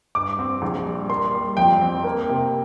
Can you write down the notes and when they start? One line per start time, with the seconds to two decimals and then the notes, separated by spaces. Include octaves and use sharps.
0.15 G2 D6
0.39 C4
0.62 A#1
0.86 G3
1.09 A#3 C6
1.34 G3
1.57 F2 G5
1.81 C4
2.04 A#3
2.29 C3